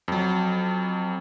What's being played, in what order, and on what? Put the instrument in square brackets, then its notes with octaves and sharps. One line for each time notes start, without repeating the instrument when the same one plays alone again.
[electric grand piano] F2 F#3